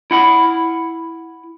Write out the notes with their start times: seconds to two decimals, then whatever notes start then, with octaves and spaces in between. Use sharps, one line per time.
0.11 E4 F#5 B5